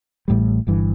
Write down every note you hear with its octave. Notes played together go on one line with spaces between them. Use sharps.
A1 A2 G3
G1 G2 E3